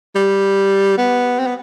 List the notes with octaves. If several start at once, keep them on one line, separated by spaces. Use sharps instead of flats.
G3
B3
C4
B3